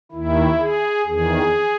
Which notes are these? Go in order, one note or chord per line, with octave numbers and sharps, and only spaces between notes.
D#2 D#3 E4
G#4
E2 D#3 G#4